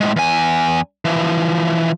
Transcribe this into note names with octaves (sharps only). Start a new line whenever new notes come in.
A2 G#3
E2 G#5
E3 F3